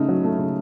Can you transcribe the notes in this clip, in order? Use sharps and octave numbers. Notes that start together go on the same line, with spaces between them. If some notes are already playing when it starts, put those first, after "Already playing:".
Already playing: C#3 A3 D#4
F#3
A3
C#3